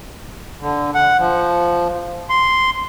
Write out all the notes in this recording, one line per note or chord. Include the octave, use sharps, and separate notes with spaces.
D3
F#5
F3
C6